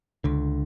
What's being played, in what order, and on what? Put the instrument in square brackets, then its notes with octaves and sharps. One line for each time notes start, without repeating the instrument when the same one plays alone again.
[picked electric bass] C#2 D3